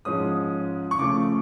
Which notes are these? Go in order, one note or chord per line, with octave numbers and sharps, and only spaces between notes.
G#2 F3 G#3 C#4 D#6
C#6
C#3 F3 A3 D6